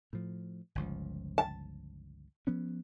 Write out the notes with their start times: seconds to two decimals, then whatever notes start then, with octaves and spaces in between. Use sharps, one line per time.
0.13 A2 F3
0.75 G1 C#2 F3
1.38 A5
2.47 F3 B3 C#4